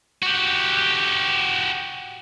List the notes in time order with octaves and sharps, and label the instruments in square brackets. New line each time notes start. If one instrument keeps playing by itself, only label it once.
[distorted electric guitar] F#4 G4